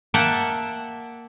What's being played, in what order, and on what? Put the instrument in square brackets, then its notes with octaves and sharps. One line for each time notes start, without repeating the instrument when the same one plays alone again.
[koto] A#3 E5 F#5 G5 A5